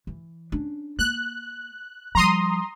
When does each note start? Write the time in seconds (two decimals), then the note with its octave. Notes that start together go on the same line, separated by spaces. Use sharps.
0.07 E3
0.52 C#4 D4
0.99 A#3 F#6
2.15 F3 G3 A#5 C6 D#6